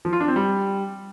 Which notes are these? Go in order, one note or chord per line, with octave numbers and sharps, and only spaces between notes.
F3
F4
D4
C4
G3